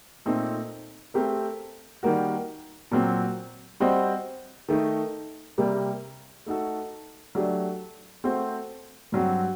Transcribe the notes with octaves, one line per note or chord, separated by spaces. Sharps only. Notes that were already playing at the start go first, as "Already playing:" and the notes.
A#2 A3 C4 D#4 A4
A3 C4 G4 A#4
D#3 G3 A#3 F#4
A#2 F#3 C4
G3 C4 F#4 C5 D#5
D#3 A3 D#4
C3 G3 A#3
A3 D#4 F#4 A4
F#3 A3 D4 G4
A3 C4 F#4 C5
G2 F#3 C4 F#4